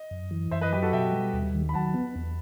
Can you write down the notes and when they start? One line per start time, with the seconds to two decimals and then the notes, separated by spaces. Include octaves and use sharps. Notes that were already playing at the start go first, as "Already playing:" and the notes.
Already playing: D#5
0.11 F#2
0.31 E3
0.51 F#2 C5 E5
0.61 B4 D#5
0.72 F#3 G4 B4
0.82 F#4 A4
0.93 B2 E5 G5
1.12 G3
1.33 D#2
1.55 D#3
1.69 B5
1.74 F#3 F#5 A5
1.94 B3
2.16 E2